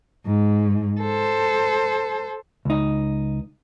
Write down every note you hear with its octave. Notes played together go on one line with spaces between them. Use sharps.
G#2
A4 C5
C#2 D#4